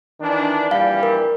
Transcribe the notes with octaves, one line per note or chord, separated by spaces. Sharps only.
D#3 E3 D4
A#1 E3 G3 F5
A#4